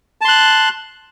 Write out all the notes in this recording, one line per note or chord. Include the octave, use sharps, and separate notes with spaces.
A5 C6 F#6